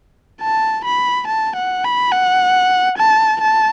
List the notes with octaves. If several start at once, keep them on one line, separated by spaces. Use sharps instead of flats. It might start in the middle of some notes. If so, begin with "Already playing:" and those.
A5
B5
A5
F#5
B5
F#5
A5
A5